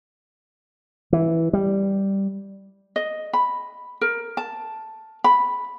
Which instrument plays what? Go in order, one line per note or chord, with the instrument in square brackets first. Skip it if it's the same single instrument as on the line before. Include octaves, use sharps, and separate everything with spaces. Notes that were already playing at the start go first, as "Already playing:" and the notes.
[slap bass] E3
G3
[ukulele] D#5
B5
A#4
A5
B5